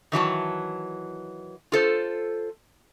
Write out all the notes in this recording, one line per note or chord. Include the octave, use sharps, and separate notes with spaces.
D#3 E3 F#3 A5
F4 A4 C5